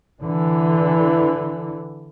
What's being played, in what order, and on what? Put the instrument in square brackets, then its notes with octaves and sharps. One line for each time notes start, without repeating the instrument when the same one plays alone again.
[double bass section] D3 E3